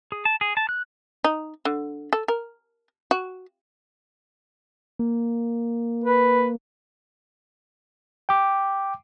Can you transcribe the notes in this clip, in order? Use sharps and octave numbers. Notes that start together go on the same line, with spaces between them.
G#4
A5
G#4
A5
F#6
D#4
D3
A4
A#4
F#4
A#3
B4
G5 D6